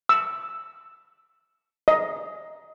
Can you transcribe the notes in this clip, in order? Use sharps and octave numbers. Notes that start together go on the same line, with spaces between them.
E6
D#5